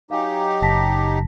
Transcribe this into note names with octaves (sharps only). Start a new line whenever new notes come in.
F#3 D#4 G4 F5 G#5
F#1 A5 A#6 B6